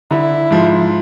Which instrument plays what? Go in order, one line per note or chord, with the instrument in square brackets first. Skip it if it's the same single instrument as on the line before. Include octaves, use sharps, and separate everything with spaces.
[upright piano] D3 [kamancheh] E4
[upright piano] G#2 F3